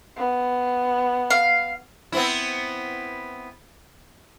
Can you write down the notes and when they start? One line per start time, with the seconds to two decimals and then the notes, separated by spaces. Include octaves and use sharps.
0.17 B3
1.30 F5
2.12 B3 C4 E4